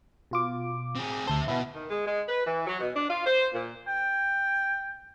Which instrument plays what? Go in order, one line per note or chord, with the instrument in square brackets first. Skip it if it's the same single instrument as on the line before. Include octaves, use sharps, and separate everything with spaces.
[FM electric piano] B2 F4 D6
[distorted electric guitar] C4 G#4
[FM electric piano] D2 A5 [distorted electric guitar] C5 E5
[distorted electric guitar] B2 [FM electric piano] B3 E4
[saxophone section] D#3
G#3
G#3
B4
E3
F#3
B2
D4
F4
C5
A#2
[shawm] G5